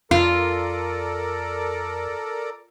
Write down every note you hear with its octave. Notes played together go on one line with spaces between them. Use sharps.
F2 F4 A4 A#4 D5